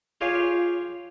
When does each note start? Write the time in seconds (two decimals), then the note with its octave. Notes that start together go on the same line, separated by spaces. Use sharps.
0.21 F4 G4 G#4 C#5 F5